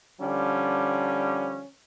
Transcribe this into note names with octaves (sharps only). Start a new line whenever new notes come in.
D3 F3 G3 C#4